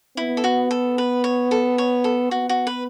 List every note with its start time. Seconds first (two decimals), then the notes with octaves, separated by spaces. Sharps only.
0.17 B3 E4
0.37 A4
0.44 F#4
0.71 A4
0.98 B4
1.24 C#5
1.51 A4
1.78 C#5
2.04 A4
2.31 B3 F#4
2.49 F#4
2.67 B4